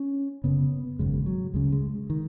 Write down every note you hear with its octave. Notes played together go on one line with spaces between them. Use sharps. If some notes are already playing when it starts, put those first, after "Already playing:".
Already playing: C#4
F#1 F#2 C#3 B3
G#1 F#2 C#3 G#3
F#3
C#2 C#3 G#3
G#3
D#3